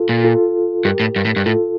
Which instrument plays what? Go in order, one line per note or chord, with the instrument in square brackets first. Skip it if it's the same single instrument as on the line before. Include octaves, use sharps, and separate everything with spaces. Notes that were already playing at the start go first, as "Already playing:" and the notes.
Already playing: [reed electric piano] F4 A4
[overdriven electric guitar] A#2
[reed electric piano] F4 A4
[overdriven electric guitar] G2 [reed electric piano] G4 A#4
[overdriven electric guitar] A2
G2
A2
G2
[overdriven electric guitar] A2 [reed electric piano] F4 A4